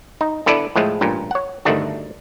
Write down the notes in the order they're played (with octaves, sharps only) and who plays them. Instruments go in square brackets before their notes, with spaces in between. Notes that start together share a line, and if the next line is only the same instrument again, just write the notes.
[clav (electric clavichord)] D#4
D3 B3 E4 A4 B4 D5
A2 F3 G#3 A3
A1 G2 A#2
C#5 F#5
G1 D2 D#3 A3 D4 F#4